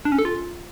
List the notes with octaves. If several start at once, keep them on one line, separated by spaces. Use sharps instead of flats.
D4
C#4
A4
F4